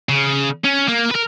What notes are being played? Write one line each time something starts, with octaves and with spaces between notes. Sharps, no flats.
C#3
C#4
A#3
A#4 B4